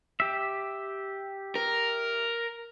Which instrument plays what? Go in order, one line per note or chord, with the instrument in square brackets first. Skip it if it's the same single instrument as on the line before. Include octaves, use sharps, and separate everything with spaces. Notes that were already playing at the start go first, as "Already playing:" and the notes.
[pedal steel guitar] G4 E5
[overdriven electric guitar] A#4